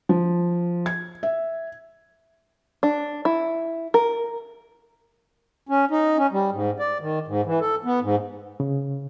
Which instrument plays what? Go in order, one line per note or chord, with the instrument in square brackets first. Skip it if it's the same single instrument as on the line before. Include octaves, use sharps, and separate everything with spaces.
[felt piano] F3
G#6
E5
[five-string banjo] D4
E4
A#4
[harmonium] C#4
D#4
C#4
G3
G#2
D5
D#3
G#2
E3
A4
B3
G#2
[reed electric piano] C#3